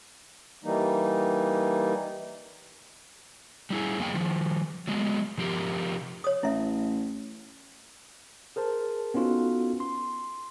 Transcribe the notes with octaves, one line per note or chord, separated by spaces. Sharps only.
E3 G3 A#3 D#4
G3 E4 G#4
F2 A#3 G#4 G5
D#3 F3
F#3 G#3 A3 B3
C3 F3 G4 A#4
C#5 D#6
A1 E4 E5
G#4 A#4 C5 A5
B3 C#4 D#4 F4 F#4 A4
C6